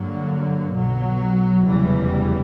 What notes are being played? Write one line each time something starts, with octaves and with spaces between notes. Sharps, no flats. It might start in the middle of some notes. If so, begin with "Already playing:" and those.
Already playing: G2 D3 F#3 A#3
B1 B2 F#3
F1 E2 C#3 E3 G3